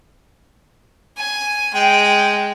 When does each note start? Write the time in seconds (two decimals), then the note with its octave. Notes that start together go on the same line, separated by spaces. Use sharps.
1.17 G#5
1.74 G#3 G5